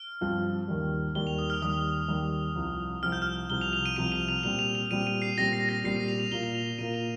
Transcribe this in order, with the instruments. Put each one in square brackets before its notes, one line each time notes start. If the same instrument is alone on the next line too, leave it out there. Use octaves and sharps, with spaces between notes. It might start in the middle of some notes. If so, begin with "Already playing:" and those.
Already playing: [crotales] F6
[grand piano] G2 F3 C4 F4
D#2 D#3 G3
[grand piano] D#2 D#3 G3 [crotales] G7
[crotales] F7
D#6
F6
[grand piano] D#2 D#3 G3 [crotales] D#6
[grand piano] D#2 D#3 G3
C2 C3 F3 C4
[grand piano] C2 C3 F3 C4 [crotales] F6
[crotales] G6
F6
[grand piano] C2 C3 F3 C4 [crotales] G7
[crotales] F7
F7
D#7
[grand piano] C2 C3 F3 C4 [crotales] D#7
[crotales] F7
F7
[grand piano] A#2 G3 C4 G4 [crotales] F7
[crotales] F7
F7
[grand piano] A#2 G3 C4 G4 [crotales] D#7
[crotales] D#7
C7
[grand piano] A#2 G3 C4 G4 [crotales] A#6
[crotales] C7
A#6
[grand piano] A#2 G3 C4 G4 [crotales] C7
[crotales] D#7
F7
F7
[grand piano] A#2 A#3 F4 [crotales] G7
[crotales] F7
F7
D#7
[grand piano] A#2 A#3 F4 [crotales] D#7
[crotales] F7